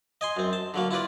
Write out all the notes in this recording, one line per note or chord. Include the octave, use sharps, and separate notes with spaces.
D#5 G#5 C6
F#2 C4
A5
D3 F#3 A#3
E4 F4 B4 D5